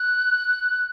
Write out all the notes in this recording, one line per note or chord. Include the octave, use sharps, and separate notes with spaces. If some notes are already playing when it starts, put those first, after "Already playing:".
Already playing: F#6